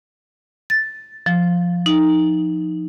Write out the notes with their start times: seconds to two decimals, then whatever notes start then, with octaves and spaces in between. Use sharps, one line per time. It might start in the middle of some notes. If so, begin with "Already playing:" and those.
0.70 A6
1.26 F3
1.86 D#4